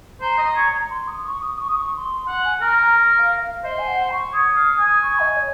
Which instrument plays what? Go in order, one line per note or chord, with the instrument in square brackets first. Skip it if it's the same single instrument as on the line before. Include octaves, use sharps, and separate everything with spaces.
[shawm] C5 [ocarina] A#5
[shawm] D#5
C#5
[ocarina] C6
D#6
C#6
D#6
C#6
D#6
C#6
C#6
C6
[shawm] F#5
[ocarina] G#5
[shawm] A#4 [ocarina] A#5
[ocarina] A#5
F5
F5
[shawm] C5 [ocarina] D#5
[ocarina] G#5
F#5
C#6
[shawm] C#5 [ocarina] D#6
[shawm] F5
G#5
[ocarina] C#6
D#5
C#5